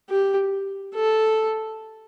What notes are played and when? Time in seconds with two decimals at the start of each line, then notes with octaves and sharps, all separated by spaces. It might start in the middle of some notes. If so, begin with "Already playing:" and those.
0.10 G4
0.95 A4